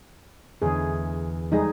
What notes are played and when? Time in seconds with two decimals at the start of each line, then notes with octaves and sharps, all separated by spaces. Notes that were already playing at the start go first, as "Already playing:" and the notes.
0.62 E2 D3 G#4
1.52 G3 G#3 D#4 G#4 D#5